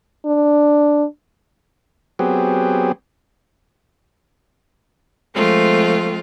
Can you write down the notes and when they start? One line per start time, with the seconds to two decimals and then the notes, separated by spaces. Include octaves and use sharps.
0.26 D4
2.19 F#3 B3 C4 G4 G#4
5.34 F3 G#3 A3 C4 F4